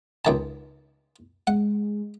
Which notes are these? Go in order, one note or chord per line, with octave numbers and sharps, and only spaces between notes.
C#2 D#3 A5
G#3 F#5